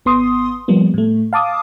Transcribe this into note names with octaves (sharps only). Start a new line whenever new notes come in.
G#1 B3 C6 D#6
F3 G3 A#3 B3
A2 A3
F5 A5 D6 D#6